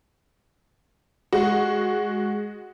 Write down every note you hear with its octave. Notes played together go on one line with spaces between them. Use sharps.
G#3 F#4